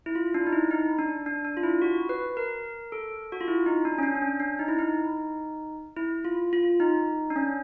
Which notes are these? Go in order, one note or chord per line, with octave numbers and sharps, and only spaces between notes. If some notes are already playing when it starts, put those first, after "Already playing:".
E4
F4
D4
D#4
E4
D#4
D4
D4
D4
F4
E4
F#4
B4
A#4
A4
F#4
F4
E4
D#4
D4
C#4
D4
D4
C#4
D4
D#4
E4
D#4
E4
F4
F4
D#4
D4
C#4